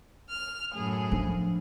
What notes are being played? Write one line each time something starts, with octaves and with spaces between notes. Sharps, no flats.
F6
F#2 A2 G#4
F3 D4